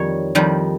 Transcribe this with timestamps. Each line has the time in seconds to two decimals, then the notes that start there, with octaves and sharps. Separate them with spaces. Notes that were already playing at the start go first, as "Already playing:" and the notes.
Already playing: F2 D#3 G3 C#5
0.35 F2 D#3 G3